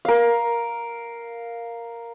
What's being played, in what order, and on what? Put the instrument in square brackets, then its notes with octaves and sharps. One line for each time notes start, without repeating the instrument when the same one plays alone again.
[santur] A#4 F5